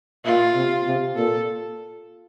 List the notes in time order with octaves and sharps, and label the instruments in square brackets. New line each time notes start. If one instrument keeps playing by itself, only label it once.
[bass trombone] A#2 [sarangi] F4
[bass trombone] C3
C3
[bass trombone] A#2 [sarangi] A4